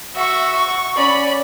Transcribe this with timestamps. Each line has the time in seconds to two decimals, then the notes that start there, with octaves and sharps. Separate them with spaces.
0.15 F#4 E5 C#6
0.56 C#6
0.96 C#4 D5 B5